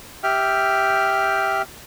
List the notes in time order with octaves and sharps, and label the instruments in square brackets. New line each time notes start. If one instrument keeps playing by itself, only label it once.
[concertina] G4 E5 G5 F6